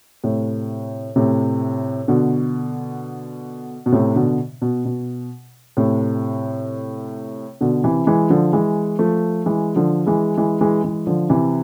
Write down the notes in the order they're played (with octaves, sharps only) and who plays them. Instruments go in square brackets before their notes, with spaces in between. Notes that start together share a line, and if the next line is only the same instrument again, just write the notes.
[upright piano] A2 C3
A2 C3
B2 D3
B2
A2 C3
B2 D3
B2
B2
A2 C3
B2 D3
C3 E3
E3 G#3
D3 F3
E3 G#3
F3 A3
E3 G#3
D3 F3
E3 G#3
E3 G#3
E3 G#3
E3 G#3
D3 F3
C3 E3